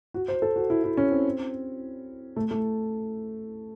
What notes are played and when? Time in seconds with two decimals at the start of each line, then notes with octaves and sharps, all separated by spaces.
0.14 F#4
0.28 C5
0.42 A4
0.56 F#4
0.70 E4
0.84 E4
0.97 C#4
1.11 C4
2.36 A3
2.51 A3